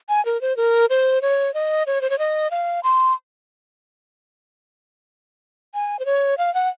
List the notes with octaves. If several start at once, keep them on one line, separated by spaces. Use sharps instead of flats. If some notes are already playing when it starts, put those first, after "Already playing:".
G#5
A#4
C5
A#4
C5
C#5
D#5
C#5
C5
C#5
D#5
F5
C6
G#5
C5
C#5
F5
F#5